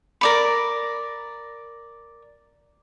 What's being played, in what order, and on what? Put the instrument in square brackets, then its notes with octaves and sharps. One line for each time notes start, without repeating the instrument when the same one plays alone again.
[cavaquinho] A#4 D5 B5